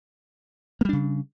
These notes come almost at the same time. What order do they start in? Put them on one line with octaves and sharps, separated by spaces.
A#3 G3 D4 C#3